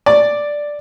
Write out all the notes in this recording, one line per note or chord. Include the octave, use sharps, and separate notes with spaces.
D5